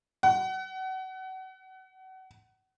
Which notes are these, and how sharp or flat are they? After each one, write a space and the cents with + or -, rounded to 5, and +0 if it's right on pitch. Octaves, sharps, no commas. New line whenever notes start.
F#5 +30